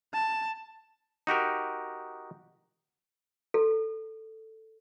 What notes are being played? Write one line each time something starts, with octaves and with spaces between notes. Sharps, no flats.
A5
D#4 F#4 G4 A#4
A4